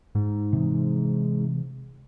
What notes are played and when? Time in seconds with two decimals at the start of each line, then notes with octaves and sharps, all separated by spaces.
0.15 G#2
0.53 C3 E3